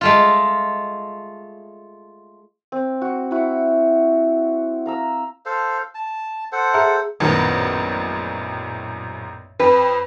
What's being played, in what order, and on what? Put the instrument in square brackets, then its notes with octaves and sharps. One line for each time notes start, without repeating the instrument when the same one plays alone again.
[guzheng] G#3 A3 F4
[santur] C4
F#4
E4 F#4
F5 A#5 E6
[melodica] A4 C5 F5
A5
A4 C5 F#5
[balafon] G#4 E5 A#5
[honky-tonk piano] A#1 F#2 A2 [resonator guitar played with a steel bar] D#3 B3
[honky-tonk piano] F2 [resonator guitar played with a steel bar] B4